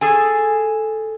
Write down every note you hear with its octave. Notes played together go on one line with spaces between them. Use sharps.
G#4 A4 G#5